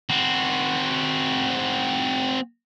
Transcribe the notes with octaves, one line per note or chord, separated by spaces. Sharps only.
C4 F#4